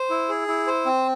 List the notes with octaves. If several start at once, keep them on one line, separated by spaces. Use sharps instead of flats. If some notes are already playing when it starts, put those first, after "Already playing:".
Already playing: C5
E4
G#4
E4
C5
C4